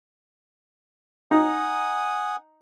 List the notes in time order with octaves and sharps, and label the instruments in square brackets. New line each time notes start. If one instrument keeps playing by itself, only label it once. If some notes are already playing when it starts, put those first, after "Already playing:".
[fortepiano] D#4 [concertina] F#5 G#5 D#6